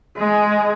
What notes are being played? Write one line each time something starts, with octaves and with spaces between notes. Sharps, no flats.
G#3